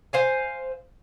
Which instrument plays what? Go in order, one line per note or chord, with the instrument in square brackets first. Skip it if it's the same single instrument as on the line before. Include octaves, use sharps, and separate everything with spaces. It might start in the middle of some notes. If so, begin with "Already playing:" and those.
[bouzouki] C5 F5 G#5